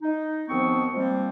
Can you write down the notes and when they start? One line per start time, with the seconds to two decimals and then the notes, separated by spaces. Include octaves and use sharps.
0.01 D#4
0.48 D#2 F3 B3 C4 C#6
0.93 F3 G3 G#3 A#3 C4